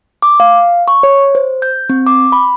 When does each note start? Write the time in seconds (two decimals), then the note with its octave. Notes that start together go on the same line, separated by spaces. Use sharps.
0.22 D6
0.40 F5
0.88 C#6
1.03 C#5
1.35 C5
1.62 G6
1.90 C4
2.07 D6
2.32 B5